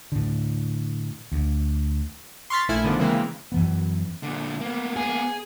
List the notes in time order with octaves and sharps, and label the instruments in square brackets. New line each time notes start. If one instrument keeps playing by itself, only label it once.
[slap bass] A2 D3
D2
[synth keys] C6 C#6 F6 A6 B6
A#1 A3 E4 G#5 F6
D3 D#3 F3 B3 D4 E4
C#3 E3 G#3 A#3 C4
[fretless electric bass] F#2 E3 B3
[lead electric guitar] A#2 D3
A#3 B3
[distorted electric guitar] G#4